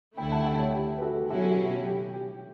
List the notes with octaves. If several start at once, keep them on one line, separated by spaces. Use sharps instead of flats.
D2 D3 A3 E4 G5 B5
F#5 A5
E5 G5
C#5 E5
G4
B4
F#4 A4
B2 F#3 C#4 E4 F#4 A4
F#4
G4
G4
G4
G4